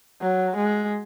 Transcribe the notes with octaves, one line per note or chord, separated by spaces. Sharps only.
F#3
G#3